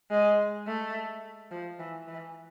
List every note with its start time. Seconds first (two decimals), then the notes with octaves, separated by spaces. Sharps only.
0.11 G#3
0.67 A3
1.51 F3
1.79 E3
2.08 E3